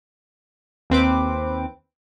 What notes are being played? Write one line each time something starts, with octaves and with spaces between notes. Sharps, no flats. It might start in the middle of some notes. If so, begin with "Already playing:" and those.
D#2 C4 B4 D6